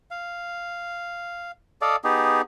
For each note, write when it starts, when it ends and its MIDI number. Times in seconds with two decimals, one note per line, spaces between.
0.11 1.51 77
1.82 1.96 69
1.82 1.96 74
1.82 1.96 75
1.82 1.96 77
2.04 2.42 59
2.04 2.42 63
2.04 2.42 67
2.04 2.42 68